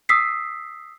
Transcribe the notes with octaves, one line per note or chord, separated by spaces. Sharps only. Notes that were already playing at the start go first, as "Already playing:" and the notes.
D#6 E6 B6 C7